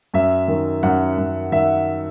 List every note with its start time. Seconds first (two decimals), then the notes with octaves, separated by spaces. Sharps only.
0.14 F#2 E5
0.48 D#3
0.83 F#2 F#5
1.18 F#2
1.52 D#3 E5